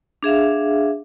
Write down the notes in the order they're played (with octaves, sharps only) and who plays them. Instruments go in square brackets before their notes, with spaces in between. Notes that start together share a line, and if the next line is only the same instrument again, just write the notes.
[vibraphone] D4 G#4 E5 F5